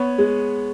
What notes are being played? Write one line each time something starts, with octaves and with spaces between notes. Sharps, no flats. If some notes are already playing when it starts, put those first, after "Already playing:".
Already playing: B3 C#5
G#3